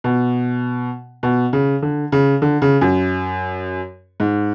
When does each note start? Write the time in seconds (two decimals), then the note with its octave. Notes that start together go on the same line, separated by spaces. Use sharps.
0.04 B2
1.23 B2
1.53 C#3
1.82 D3
2.12 C#3
2.42 D3
2.62 C#3
2.81 F#2
4.20 G#2